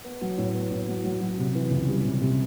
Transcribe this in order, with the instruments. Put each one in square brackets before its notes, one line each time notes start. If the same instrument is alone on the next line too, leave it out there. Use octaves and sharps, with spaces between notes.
[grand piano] B3
F#3
A2
B3
A2
F#3
F#3
F#3
C3
E3
C#2
G3
C3
C3